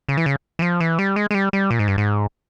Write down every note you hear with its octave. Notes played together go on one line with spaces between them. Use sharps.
C#3
E3
C#3
E3
F3
E3
G3
G#3
G#3
G3
G3
A#2
G#2
G2
G#2